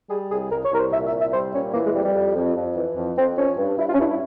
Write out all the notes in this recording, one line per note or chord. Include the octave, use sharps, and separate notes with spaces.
G3 G#4
C2 G#4
C2 A#4
C#5
C2 A#4
C5
A#2 E5
E5
C2
E5
G3 C5
A#2 C#4
E3 A#3
G#3
F2 G3
G3
F2
F2
F2
E3
F2
F2 C4
F3 C#4
G2
G2 E4
F4
C#4
G2 E4
E4